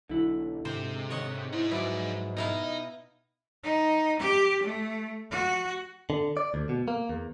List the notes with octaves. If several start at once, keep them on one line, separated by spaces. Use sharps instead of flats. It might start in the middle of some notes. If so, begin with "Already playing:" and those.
B1 D3 E4
G#2 C3 C5
C#5 D#5 F#5
D#4 E4 C5
F3 F#3 E4 B4 D5
B2 D#4 E4 F5
D#4
G4
A3
F#4
D3
D5
D2
B2
A#3
E2